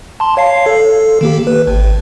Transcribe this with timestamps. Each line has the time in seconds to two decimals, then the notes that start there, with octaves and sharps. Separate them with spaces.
0.20 A5 C6
0.37 C#5 F5 C7
0.66 A4
1.21 D#3 A#3 G4
1.47 B4
1.67 G#1